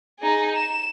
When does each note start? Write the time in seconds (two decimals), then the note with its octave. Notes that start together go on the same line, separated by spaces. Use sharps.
0.20 D#4 G#4
0.56 E7